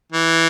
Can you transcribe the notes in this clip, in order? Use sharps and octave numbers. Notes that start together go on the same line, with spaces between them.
E3